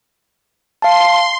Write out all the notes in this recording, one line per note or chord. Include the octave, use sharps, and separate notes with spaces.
F5 A5 C6